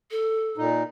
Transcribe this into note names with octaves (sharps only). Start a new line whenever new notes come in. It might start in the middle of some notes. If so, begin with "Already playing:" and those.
A4
A#2 D#4